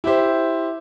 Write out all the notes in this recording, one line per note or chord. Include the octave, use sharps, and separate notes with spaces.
E4 G4 C5